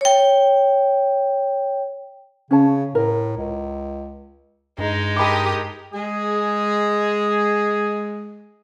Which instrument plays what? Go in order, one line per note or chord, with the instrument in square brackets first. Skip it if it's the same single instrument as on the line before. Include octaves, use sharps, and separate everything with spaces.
[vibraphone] C#5 G5
[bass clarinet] C#3 [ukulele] C#4 C#5 A5
[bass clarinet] A2 [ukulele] A#4
[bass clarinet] C#2
[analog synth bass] G2 [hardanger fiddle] G#3 D#4
[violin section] G4 A#4 D#6 [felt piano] A5 B5 D6
[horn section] G#3 G#4